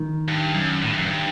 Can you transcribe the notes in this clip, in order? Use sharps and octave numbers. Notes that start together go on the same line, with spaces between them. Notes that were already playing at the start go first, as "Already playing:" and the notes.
Already playing: D#3
G2
F#2
A2
G2
F#2
G2